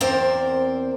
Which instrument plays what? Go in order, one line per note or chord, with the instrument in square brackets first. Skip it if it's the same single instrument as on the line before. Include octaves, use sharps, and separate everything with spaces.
[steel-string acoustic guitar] E2 C4 A#4 C5 D5